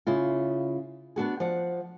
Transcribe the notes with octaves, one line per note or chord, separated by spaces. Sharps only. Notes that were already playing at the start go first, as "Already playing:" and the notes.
C#3 E4 F4
B3 D4 F#4 G#4
F3 D5 F#5